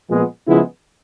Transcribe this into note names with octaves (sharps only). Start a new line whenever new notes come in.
A#2 F3 G#3 B3
C#3 F3 G#3 B3 E4